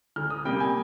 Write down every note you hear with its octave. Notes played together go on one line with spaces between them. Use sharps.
D2 F6
D#6
C3 G3 A#3 G5
G#5